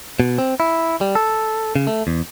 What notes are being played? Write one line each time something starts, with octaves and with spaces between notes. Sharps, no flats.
B2
C4
E4
G3
A4
C#3
A3
E2